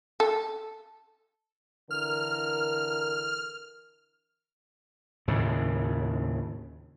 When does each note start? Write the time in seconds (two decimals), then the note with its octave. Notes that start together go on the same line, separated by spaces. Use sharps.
0.20 A4
1.91 D3 E3 A#4 F6
5.28 D#2 A2 C#3